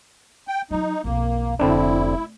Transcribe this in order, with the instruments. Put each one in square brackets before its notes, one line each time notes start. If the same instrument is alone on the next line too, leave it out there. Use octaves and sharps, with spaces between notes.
[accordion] G5
[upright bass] F#3 F4 [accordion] D#4
[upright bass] B1 F2 [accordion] A#3
[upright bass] F1 [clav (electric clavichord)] D3 C4 D4 [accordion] E4